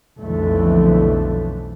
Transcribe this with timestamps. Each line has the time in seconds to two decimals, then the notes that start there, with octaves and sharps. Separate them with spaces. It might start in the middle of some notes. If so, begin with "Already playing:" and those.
0.18 B1 F2 D3 E3 A3